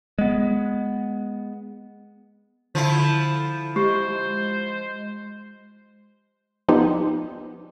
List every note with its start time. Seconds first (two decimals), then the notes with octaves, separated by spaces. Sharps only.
0.18 G#3 B3
2.75 D3 F3 E4
3.76 G#3 G4 C5
6.68 F3 B3 D4 D#4 G4 C5